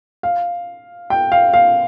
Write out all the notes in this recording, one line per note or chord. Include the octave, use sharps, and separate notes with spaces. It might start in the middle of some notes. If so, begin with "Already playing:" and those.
F5
G5
F5
F5